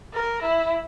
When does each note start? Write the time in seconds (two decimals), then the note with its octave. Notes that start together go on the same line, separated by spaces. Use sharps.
0.13 A#4
0.42 E4